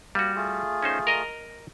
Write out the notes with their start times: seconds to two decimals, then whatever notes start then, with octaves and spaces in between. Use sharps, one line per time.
0.15 G3 A#3 F#4
0.36 A3 F4 G#4
0.83 C#4 D#4 C5
1.07 A#4 D#5 A#5